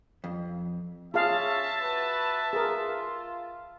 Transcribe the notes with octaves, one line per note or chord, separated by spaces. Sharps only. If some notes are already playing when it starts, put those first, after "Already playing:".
F2
C#4 F4 G#4 E5 F5 A5
F#4 B4
F4 G#4 A#4